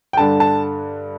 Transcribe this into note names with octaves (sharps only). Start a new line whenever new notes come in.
G5
G2 D3 A5
A5